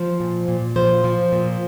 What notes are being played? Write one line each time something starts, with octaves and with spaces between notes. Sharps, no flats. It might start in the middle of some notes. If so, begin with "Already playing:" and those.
Already playing: F3 C5
A#2
A#2
F3 C5
F3
A#2